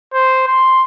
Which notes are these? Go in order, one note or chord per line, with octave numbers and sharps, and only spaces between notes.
C5
C6